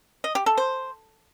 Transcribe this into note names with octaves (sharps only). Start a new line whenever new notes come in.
D#5
G4
A4
C5